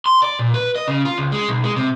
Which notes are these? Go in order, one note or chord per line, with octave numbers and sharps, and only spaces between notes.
C6
D5
A#2
B4
D#5
C#3
F4
C#2
G#3
B1
G#3
C3